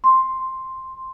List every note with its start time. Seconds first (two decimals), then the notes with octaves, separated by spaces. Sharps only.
0.04 C6